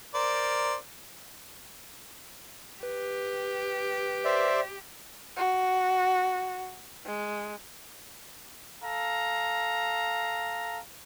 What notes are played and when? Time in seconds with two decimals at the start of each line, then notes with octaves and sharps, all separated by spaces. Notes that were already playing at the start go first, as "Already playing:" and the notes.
0.14 A#4 C5 D5
2.83 G4 B4
4.25 C5 D5 E5
5.37 F#4
7.06 G#3
8.83 A4 F5 A#5